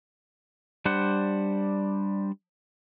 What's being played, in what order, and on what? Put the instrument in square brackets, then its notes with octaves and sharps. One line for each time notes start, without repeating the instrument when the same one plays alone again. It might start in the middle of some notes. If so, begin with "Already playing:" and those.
[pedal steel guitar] G3 D4 C5 F#5